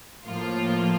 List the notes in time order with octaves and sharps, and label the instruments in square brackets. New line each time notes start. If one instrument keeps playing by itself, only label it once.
[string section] A2 F3 A#3 F4